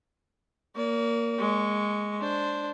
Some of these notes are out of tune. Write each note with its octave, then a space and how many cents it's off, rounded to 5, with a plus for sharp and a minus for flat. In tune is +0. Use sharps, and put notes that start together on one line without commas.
A#3 +0 D5 -45
G#3 +0 C#6 +10
D4 +0 C5 +0